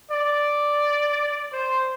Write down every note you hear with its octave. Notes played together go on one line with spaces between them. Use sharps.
D5
C5